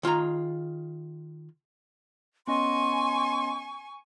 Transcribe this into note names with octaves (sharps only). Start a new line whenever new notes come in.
D#3 F4 G#4 A#5
B3 C#4 D#5 G#5 C6 C#6